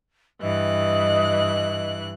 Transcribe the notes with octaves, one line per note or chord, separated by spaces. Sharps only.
G2 E3 D#5 F#6